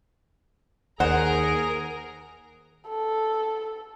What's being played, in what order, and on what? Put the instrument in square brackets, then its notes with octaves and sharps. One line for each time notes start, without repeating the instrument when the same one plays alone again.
[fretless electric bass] D#2 [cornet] G#4 [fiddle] A#4 A#5 [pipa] C5 F#5
[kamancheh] A4